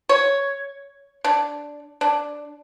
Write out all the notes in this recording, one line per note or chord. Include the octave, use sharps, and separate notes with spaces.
C#5
D4
D4